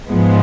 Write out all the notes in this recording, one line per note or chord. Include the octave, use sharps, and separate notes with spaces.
G#2 F3 G#3 B3